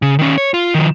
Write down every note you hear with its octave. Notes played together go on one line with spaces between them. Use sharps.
C#3
D#3 C#4
C#5
F4
D#3 F3